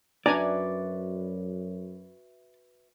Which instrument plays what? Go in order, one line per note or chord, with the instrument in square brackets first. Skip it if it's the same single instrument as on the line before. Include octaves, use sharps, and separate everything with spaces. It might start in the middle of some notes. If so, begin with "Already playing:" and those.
[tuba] F#2 [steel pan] D4 G#5 A#5 [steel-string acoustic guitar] F#4 B4 E5 [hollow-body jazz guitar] D5